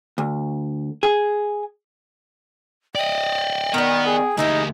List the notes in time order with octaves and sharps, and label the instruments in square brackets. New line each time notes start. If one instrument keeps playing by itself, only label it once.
[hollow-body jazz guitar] D2
G#4
[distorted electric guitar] D5 D#5 [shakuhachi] G5
[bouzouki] D#3 G3 [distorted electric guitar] B3 [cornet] A#4
[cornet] G#4
[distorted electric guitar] D2 G4 [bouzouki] A#3 E4 G#4 [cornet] D#4 [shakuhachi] D#5